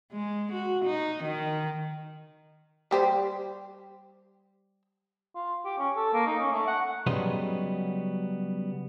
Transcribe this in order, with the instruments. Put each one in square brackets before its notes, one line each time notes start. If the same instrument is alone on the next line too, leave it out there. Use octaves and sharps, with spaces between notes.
[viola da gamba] G#3
F#4
D#4
D#3
[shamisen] G3 G4 C5
[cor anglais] F4
G4
C#4
A4
A#3
D#4
C#4
A3
F#5
[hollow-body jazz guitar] C#3 F#3 G3 B3 D#5 C6